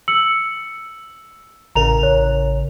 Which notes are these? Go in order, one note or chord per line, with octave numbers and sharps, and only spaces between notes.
E6 C#7 F#7
A1 C#3 A#4 A#5 F7
C#5